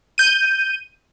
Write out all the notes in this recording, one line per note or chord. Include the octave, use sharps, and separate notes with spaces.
G6 D#7